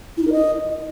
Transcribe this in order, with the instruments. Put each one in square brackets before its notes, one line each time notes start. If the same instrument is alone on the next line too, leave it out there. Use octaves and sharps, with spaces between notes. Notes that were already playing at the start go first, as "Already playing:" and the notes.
[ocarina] E4
D#4
A#4
D#5